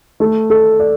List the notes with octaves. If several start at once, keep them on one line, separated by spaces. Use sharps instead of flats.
A3
A4
D5